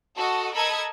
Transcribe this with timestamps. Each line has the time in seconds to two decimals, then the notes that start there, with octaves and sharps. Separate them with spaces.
0.16 F#4 A4 D#5
0.54 A4 A#4 D#5 B5 E6 G#6